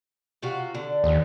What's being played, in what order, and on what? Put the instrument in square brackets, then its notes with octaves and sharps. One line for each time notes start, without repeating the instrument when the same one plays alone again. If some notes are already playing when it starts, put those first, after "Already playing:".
[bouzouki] C3 F4 F#4
D3
[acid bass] D#2